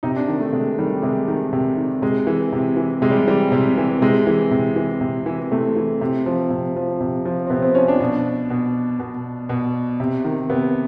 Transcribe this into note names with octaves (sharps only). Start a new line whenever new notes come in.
C3 D#4
D4
D#3
A3
C3 G#3
D#3 G3
C3 G#3
D#3
C3
D#3
C3 G#3
E3
C3
E3
C3 G#3
G3
E3 G3
C3
E3
C3 G#3
E3
C3
E3
C3
E3
C3 A3
E3
C3
F3
C3
F3
C3
F3
C4
C3 B3
C4
F3 C#4
D4
B2 D4
B2
B2
B2
C3
D#3
C3 B3